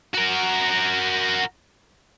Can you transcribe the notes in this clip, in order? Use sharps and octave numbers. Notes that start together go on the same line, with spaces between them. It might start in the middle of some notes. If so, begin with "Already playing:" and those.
F#4 A#4